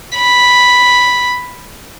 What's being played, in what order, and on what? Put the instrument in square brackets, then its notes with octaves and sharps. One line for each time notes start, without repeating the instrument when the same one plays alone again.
[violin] B5